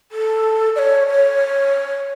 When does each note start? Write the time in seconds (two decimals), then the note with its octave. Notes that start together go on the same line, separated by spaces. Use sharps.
0.12 A4
0.76 D5
0.79 C#5
1.07 C#5